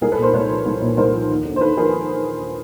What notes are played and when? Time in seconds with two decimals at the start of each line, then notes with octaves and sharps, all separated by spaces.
0.01 C2 G#4 A#4
0.12 A4 B4
0.18 A#2 A#4 C5
0.33 C2 B4 C#5
0.50 F3
0.65 C2
0.82 A#2
0.97 C2 A#4 C5
1.13 F3
1.29 D#2
1.45 D3
1.56 C5
1.61 D#2 A4 B4
1.77 F3 G#4 A#4